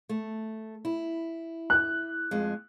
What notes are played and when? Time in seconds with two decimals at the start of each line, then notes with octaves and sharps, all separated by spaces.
0.09 A3
0.85 E4
1.70 F#6
2.31 F2 G#3